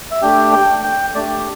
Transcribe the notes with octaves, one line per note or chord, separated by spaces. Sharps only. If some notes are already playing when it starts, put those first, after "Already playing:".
E5
A3 D4 G4 G5
G5
G5
A3 D4 G4 D5